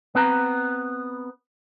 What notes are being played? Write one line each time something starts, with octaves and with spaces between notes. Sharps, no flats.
B3 C4 B4 A5 A#5